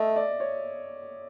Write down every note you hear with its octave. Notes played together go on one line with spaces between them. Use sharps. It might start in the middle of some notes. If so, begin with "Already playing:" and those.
Already playing: A3 D#5 E5
D5
C#5